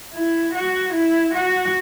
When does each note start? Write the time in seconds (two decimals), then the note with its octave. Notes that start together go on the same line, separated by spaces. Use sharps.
0.14 E4
0.54 F#4
0.94 E4
1.34 F#4